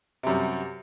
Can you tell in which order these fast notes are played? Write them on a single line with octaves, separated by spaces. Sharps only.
C3 F#2 G3